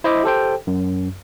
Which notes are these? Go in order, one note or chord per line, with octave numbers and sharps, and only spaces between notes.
E4 C5 D#5 E5 D6
G4 A4 C5 G5
F#2